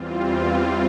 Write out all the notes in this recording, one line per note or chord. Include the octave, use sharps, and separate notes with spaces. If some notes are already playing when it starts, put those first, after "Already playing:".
Already playing: E2 E3 G3 C4 F4